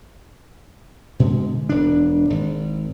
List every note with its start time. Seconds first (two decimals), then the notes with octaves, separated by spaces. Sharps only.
1.20 B2 D3 G#3
1.69 E1 D4
2.30 G#1